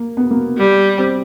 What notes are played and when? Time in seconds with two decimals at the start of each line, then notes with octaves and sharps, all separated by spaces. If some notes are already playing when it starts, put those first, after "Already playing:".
Already playing: A#3
0.17 B3
0.31 A#3
0.58 G3
0.98 C4